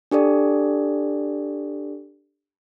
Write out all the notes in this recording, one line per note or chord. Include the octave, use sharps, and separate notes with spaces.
D4 G4 A4 D5